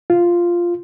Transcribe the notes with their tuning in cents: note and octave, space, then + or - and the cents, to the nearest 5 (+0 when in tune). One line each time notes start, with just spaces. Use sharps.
F4 -5